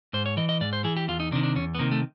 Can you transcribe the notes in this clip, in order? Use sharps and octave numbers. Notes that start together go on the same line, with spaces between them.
G#2 C5
C#5
E3 D#5
D#5
G#2 D5
C5
E3 G#4
G4
E2 F4
D#4
C3 D#3 D4
D4
E2 C#4
B3
C3 D#3 A#3
A3